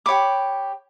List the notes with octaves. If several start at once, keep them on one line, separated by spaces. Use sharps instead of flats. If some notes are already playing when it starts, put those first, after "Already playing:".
G4 C#5 B5 D6